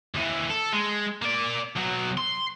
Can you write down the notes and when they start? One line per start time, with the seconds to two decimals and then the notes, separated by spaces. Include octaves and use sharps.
0.15 D#2 E3
0.50 A4
0.73 G#3
1.22 A#3 D5
1.76 B1 F#3
2.17 C6